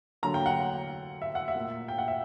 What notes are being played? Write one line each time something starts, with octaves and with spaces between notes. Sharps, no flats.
D3 F#3 A#3 A#5
G5
F#5
E5
F#5
E5
A#2 A#3
G5
F#5
E5